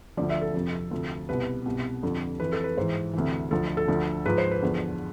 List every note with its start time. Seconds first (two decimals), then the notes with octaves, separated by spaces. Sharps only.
0.17 D2 D3 F3 D5
0.30 E5
0.41 A4
0.54 F2 C3 F3
0.91 D2 C3 F3
1.29 C2 B2 B4
1.66 C2 B2
2.03 F2 D3 F3
2.40 F2 E3 B4
2.52 A4
2.64 B4
2.77 G#2 E3 C5
3.13 D2 C3 E3
3.51 D2 D3 F3 A4
3.77 A4
3.88 D2 D3 F3
4.26 G#2 F3 B4
4.38 C5
4.51 B4
4.62 E2 D3 F3